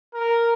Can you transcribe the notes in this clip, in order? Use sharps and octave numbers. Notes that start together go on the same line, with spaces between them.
A#4